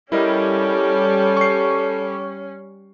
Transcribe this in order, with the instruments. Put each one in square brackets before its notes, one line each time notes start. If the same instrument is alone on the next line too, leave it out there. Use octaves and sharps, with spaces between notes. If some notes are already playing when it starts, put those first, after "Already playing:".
[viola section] G3 [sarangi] C#4 [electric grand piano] E4 A#4 D#5 [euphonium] A4
[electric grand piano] C#6 C7